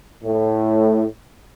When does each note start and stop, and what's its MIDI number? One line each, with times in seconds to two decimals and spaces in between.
0.24 1.05 45